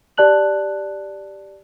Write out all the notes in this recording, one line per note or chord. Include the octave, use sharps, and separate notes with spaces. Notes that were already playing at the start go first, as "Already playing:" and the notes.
G4 D5 A5 F#6 F#7